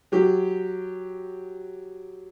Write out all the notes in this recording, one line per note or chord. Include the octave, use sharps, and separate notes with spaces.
F#3 G4